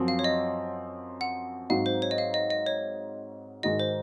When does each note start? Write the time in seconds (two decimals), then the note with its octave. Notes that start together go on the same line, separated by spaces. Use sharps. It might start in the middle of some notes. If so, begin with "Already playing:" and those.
Already playing: F#2 F3 C4 F#4
0.08 F5
0.19 C#5
0.24 D#5
1.21 F#5
1.70 G#2 F#3 C4 D#4 F#4 F5
1.86 C5
2.02 C#5
2.11 D#5
2.18 F5
2.34 D#5
2.50 D#5
2.66 C#5
3.63 G#2 D#3 G#3 D#4 F#4 D#5
3.80 C5